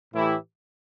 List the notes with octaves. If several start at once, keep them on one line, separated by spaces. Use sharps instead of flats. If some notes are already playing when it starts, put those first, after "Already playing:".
A2 E3 A3 E4 G4